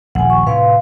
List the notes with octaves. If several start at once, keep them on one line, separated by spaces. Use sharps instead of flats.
D#1 A#1 F#5 G#5
C#6
A2 C3 B4 F5 C6